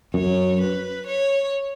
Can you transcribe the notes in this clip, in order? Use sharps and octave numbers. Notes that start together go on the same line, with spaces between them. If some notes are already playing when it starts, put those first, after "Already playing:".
F#2 C#5
B4
C#5